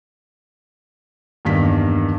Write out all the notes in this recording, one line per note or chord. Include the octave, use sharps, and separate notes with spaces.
E2 G2 D#3 A#3 B6